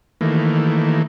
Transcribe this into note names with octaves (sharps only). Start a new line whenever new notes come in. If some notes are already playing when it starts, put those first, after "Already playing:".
D#3 E3 A3 A#3